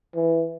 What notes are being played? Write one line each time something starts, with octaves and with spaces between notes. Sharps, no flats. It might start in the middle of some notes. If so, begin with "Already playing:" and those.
E3